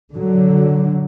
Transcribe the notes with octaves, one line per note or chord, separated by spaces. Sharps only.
D3 F#3